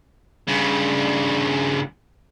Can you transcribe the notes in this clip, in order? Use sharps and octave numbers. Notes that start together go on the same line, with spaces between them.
G2 C#3